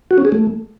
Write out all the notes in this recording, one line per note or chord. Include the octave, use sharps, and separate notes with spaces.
F#4
C#4
G#4
A3